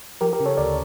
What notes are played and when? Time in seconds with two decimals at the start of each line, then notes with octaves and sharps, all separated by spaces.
0.21 F3 G4 A#4
0.33 G4 A#4
0.40 C#3
0.46 A4 C#5
0.57 D2 A#4 D5